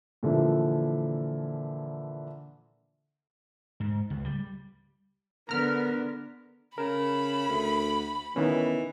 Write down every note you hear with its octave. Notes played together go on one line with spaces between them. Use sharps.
A#2 D3 E3 F3
G#2
C#2
G3
D3 B3 A#4 A#5 F6
C#3 A#4 B5
D2
D#3 E3 B3 C#4